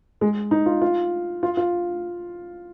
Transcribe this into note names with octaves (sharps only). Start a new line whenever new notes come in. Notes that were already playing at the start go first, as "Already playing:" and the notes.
G#3
D#4
F4
F4
F4
F4